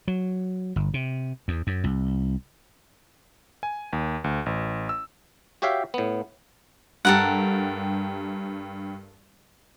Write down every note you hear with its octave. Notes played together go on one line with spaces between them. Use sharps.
F#3
G1
C3
E2
F#2
C2
G#5
D#2
D2
A1
E6
F#4 G4 C#5 E5 F5 G5
A2 B3
G2 G4 A4 A#4 F#5